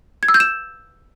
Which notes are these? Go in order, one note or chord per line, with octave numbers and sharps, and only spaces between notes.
G#6
E6
G6
E7